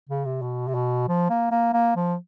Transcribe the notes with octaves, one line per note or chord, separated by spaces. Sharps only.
C#3
C3
B2
C3
B2
F3
A#3
A#3
A#3
F3